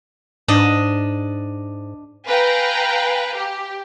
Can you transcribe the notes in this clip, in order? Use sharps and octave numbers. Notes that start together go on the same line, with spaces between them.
G#2 D4 D#5
B4 F5 G5 G#5 A#5
G4